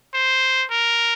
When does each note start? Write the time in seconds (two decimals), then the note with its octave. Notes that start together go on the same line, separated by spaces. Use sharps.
0.14 C5
0.70 A#4